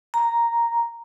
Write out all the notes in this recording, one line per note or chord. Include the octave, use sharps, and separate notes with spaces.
A#5